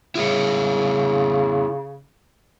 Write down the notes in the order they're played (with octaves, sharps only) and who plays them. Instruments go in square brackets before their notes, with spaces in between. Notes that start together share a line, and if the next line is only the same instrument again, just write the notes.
[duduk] C#3 [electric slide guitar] E4 G#4 C#5